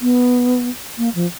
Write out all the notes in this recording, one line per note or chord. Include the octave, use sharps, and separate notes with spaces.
B3
A#3
F3